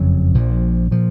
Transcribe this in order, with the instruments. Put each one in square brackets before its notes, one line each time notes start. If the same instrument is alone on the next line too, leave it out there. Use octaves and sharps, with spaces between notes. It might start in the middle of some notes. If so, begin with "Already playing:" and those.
Already playing: [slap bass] F#1 F2 C#3 F#3
A#1 A#2 F3
A#2 F3